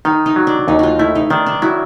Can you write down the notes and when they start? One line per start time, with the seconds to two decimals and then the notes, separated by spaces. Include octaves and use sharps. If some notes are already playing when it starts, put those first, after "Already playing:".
0.05 D#3 D#4
0.26 D#4
0.36 F#3
0.47 D4
0.68 D#2 D#4
0.79 F4 F#4
0.99 A3 E4
1.15 D#4
1.30 D#3 D4
1.46 D4
1.62 F#3 E4